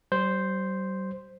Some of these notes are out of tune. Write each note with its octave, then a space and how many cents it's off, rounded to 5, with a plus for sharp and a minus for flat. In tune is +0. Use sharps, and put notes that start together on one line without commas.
G3 -45 C5 +0